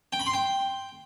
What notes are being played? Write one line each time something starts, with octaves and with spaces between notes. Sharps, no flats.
G5
B5
C6
G5